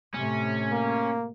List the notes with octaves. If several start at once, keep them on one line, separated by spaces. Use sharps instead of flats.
A2 C3 C#4
A#3